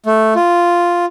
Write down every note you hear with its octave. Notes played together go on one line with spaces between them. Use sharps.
A3
F4